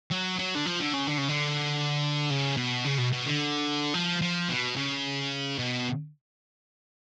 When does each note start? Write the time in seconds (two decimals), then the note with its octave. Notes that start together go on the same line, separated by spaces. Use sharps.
0.11 F#3
0.39 F#3
0.55 D3
0.66 F3
0.80 D3
0.93 C#3
1.07 D3
1.18 C#3
1.28 D3
2.30 C#3
2.57 B2
2.85 C#3
2.98 B2
3.12 B2
3.25 D3
3.94 F3
4.22 F3
4.49 B2
4.76 C#3
5.58 B2